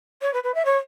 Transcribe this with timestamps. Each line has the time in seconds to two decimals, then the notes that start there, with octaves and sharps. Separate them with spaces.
0.22 C#5
0.33 B4
0.44 B4
0.55 E5
0.65 C#5